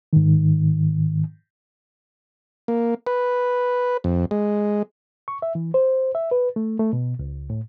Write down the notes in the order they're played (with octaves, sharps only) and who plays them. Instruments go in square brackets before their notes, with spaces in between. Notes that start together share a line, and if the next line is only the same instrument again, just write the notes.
[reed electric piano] G#2 D#3
[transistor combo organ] A#3
B4
F2
G#3
[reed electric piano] C#6
E5
E3
C5
E5
B4
A3
A3
B2
C#2
A2